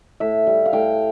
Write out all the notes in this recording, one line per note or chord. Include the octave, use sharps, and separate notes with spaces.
A2 E5
G3
F5
A2 G5